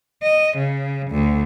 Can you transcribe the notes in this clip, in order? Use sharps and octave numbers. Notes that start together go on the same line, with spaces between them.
D#5
C#3
D2